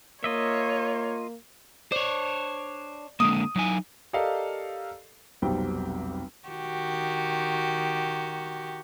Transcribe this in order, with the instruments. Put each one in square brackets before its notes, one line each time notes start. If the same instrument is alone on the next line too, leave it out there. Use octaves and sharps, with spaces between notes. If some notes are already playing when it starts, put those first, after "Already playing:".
[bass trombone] A#3 [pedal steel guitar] F4 D#5 E5 [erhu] C#5
[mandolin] D4 [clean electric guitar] C5 C#5
[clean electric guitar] D3 G#3 A#3 [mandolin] D#6
[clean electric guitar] F#3 D#4 G#5
[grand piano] G4 A4 A#4 D5 D#5 F5
[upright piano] F1 B1 F#3 G3 C4 G5
[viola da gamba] D#3 F#4 G4